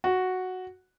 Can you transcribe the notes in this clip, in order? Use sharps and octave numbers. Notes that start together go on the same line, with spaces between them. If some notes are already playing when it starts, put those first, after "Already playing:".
F#4